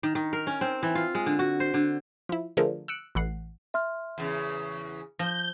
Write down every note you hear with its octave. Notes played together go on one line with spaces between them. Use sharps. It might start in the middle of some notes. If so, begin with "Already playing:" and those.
D#3
D#3
A#4
C#4
C4
E3
F4
G#3
D3
F#4
C5
D3
F3 E4
D3 F3 A3 G#4 A#4
E6 F#6 C#7 D7
A1 E3 F#5 C7
E5 C6 F6
E2 C#3
F3 G6 A#6